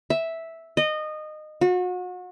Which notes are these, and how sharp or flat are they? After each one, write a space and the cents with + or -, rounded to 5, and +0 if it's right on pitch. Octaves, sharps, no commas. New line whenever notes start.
E5 -5
D#5 -20
F#4 -35